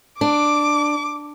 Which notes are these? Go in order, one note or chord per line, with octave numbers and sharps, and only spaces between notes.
D4 D6